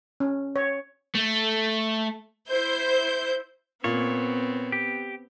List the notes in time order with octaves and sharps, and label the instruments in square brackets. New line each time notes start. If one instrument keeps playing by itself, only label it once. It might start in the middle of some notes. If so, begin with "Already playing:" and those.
[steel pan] C#4
C#5
[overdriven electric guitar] A3
[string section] E4 C5 G6
[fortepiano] A#2 [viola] B3 C4 [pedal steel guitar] C#5
[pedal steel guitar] G4